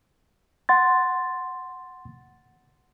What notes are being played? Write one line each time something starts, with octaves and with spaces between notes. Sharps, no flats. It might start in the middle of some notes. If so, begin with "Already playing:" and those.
F#5 C6 A6